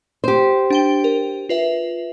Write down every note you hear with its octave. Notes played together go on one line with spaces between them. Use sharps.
G4 C5
D4 G5 G7
A#4
F4 B4 E5